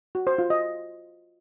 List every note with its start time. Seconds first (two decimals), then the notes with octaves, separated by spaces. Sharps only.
0.15 F#4
0.27 C5
0.38 F4
0.50 D#5